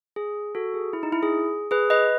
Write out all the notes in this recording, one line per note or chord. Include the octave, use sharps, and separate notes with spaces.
G#4
F#4 A4
G#4
E4
D#4
E4
G#4
G#4 B4
B4 D#5